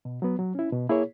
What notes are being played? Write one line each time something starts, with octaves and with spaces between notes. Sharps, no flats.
B2
F#3 B3
F#3
C#4 E4
B2
A#3 E4 G#4 C#5